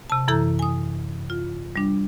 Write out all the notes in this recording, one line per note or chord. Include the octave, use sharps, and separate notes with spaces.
C3 A5
F#2 E3 E4 A4 A#5 G6
G#5 D#6
F4
G3 D4